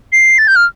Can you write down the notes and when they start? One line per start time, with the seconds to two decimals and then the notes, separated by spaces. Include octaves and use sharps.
0.13 C7
0.38 A6
0.48 G6
0.56 F6